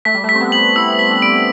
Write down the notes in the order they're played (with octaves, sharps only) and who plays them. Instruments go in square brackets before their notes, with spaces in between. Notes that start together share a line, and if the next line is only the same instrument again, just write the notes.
[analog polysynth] A3 [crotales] B6
[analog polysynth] G3
A3
[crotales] B6
[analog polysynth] C4
B3
[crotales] F#7
[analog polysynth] E4 [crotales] E6
[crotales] B6
[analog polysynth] D4
[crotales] D7